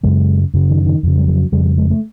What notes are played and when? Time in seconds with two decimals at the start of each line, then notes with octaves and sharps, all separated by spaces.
0.03 F#2 C#3 G#3
0.54 F#2 C#3
0.70 D#3
0.86 D#3
1.03 F2 C#3
1.17 G3
1.28 F#3
1.52 F2 C#3 G3
1.65 G3
1.78 G#3
1.90 A3